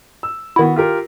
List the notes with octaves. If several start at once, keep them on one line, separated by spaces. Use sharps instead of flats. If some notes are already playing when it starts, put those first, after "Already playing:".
E6
D#3 B3 E4 F#4
F4 G4 A#4